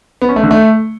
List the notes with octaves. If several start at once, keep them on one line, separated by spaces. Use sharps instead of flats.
B3
C#4
A3
D3
A3